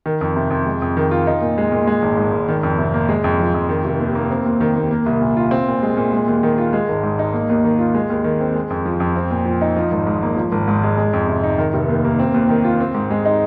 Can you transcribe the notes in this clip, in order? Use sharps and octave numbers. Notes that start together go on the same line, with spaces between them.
D#3
F2
C3
F2
G#3
F2
D#3
F4
D#4
A#2
G#3
A#2
G#3
G#1
G#2
G#1
D#3
F2
C3
A#3
G#3
F2
F3
F2
D#3
F1
D#2
A#3
C4
D#2
D#3
D#2
A#3
C2
A#2
F4
C4
A#2
G#3
A#2
G#3
D#2
D#3
F4
G#3
G#1
G#2
D#4
A#3
D#2
D#3
F4
G#3
D#2
D#3
C4
G#3
F2
F3
F2
C4
A#2
F3
D#4
F3
G#1
G#2
A#3
F3
G#1
G#2
G#3
G#3
F2
C3
D#4
D#3
F1
D#2
A#3
C4
D#2
D#3
F4
C4
G#2
G#3
D#4